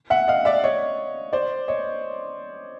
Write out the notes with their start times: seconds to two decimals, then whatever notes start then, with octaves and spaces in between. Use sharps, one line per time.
0.10 E5 F#5
0.28 D#5 F5
0.45 D5 E5
0.64 C#5 D#5
1.33 C5 D5
1.68 C#5 D#5